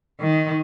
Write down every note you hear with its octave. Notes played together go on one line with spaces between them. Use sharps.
D#3